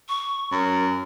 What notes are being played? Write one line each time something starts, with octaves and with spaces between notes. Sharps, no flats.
C#6
F#2 A#4